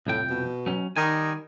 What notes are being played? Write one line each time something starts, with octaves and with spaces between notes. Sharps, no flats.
C2 F2 A2 G5
B2
F#3 C#4
D#3 G3 D#5 G#5